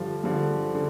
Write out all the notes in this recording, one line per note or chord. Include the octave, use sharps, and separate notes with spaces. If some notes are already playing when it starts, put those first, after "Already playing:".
Already playing: G2 D3 F3
G2 D3 F3
D3